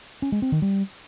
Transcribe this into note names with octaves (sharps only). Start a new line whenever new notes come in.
C#4
G#3
C4
D#3
G3